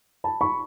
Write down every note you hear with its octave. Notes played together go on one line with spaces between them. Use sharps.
A5 B5
B5 C#6